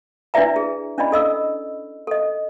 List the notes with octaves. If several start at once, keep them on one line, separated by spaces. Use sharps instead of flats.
D4 E4 B4 D5 E5 A#5
G#4
C#4 D4 E4 D5 D#5 B5
A4 D#5 E6
A4 D#5